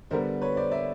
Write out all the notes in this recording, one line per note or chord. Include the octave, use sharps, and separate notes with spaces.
D3 G3 B3 A#4 C5
B4 C#5
C5 D5
D5 E5